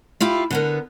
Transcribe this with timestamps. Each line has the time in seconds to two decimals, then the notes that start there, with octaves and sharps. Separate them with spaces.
0.20 E4 F4 G4 F5
0.50 D3 B3 A#4